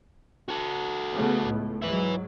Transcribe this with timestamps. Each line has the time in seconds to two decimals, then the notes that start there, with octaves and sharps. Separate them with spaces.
0.48 F#4 A4
1.12 C#3 A3 B3
1.46 C#2 A2
1.82 G#2 F#3 E4 B4